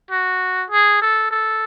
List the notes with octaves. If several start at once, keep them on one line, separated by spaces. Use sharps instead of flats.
F#4
G#4
A4
A4